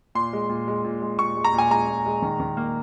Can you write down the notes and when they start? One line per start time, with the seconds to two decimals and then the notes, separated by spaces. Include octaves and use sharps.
0.15 A#2 C6
0.33 G#3
0.49 A#2
0.68 G#3
0.84 A#2
1.02 G#3
1.19 A#2 C#6
1.37 G#3
1.45 A#5
1.53 A#2
1.58 G#5
1.70 G#3 A#5
1.88 A#2
2.06 G#3
2.22 D#3
2.40 D#3
2.57 A#3